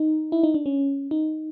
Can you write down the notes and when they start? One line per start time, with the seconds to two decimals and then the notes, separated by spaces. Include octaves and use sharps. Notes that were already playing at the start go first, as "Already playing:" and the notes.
Already playing: D#4
0.32 E4
0.43 D#4
0.54 D4
0.66 C#4
1.11 D#4